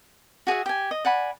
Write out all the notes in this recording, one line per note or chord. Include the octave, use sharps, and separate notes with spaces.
F#4 G#4 E5 F#5
G4 G#5
D#5
D5 F#5 G#5 B5